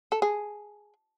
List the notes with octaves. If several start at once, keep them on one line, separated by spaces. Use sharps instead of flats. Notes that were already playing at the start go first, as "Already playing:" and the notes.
A4
G#4